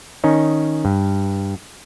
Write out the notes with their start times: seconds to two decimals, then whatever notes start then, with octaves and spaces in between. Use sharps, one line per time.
0.24 D#3 C#4 D#4
0.85 G2